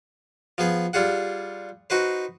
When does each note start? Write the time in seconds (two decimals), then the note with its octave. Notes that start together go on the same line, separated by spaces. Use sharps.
0.58 F3 B3 G#4
0.93 G3 F4 G#4 F#5
1.90 D#4 F#4 B4 C5